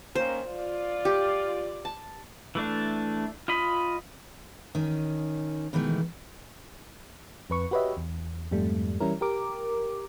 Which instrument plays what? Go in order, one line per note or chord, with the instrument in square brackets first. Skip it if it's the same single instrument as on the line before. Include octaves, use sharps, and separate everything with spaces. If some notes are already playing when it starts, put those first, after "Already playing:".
[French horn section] D#3 A#3 C#4 [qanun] C5
[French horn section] F4 D5
[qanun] G4
A5
[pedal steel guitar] E3 A3 D4
F4 D#5 B5
[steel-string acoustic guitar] D#3 C#4
B2 D#3 E3 G#3 A3
[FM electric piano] F2 B4 C#6
F#4 G4 B4 C#5 D#5 E5
E2
F2 G#2 G3 A3
E3 G3 C#4 E4 A#4
G4 A#4 D6